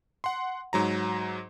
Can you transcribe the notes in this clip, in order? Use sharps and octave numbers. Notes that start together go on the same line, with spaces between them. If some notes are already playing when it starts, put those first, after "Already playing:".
F#5 C6
G#2 F#3 A#5